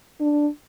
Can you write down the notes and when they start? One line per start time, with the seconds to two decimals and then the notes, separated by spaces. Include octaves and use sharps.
0.20 D4